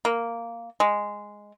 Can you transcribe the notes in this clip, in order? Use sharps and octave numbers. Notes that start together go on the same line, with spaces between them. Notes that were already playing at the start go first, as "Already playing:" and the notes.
A#3
G#3